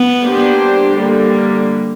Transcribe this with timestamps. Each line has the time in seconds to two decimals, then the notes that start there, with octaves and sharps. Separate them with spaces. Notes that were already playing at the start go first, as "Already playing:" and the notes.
Already playing: B3
0.22 G3 A#3 D4 G4 C5
0.96 D3 G3 A#3